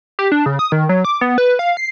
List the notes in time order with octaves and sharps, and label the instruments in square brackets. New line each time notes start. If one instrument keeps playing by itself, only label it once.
[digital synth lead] G4
D4
C#3
D#6
D#3
F#3
D6
B3
B4
F5
C7